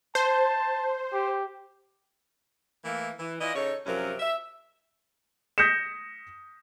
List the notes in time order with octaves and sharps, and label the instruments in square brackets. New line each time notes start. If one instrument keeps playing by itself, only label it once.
[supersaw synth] C5 [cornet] A5
[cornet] G4
[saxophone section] E3 A3 A#3
E3
E3 F4 D5 D#5
C#3 D#4 A4 C#5
F#2 C3 F3 F#3 C#4 A#4
E5
[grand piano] D#6 G6 A#6 B6 C#7 E7